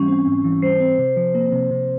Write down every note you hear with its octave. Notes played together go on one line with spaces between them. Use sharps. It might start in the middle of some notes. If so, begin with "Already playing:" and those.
Already playing: G#2 E3 G3 C#4
C4
G#2
E3
G3 C5
C4
C3
F3
A#3
C3
C3